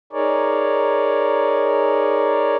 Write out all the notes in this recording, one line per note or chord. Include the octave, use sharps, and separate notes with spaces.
D#4 G#4 A#4 C#5 D5